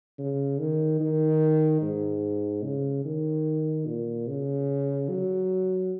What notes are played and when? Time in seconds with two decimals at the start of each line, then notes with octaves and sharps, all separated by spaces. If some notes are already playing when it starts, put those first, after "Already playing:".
0.18 C#3
0.59 D#3
1.00 D#3
1.82 G#2
2.64 C#3
3.05 D#3
3.86 A#2
4.28 C#3
5.10 F#3